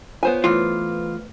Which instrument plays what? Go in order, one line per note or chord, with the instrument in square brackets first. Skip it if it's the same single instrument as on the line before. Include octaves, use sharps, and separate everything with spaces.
[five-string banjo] B3 C5 G#5 [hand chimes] F4 C#5
[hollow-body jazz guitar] E3 F4 [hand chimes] A3 F6